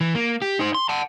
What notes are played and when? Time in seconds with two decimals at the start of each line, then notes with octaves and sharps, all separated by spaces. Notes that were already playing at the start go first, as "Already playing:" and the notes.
0.01 E3
0.15 A#3
0.42 G4
0.59 D#4 C5
0.75 C6
0.89 F#5 A5